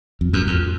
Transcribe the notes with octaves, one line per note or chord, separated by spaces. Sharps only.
F2
F#2
F2